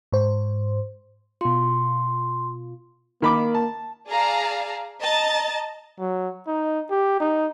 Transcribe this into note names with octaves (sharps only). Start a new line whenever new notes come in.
G#2 C5
B2 F4 C6
D#3 A#3 B5 D6
A5
G#4 D5 F5 A5 A#5
D#5 A5 A#5 A6
F#3
D#4
G4
D#4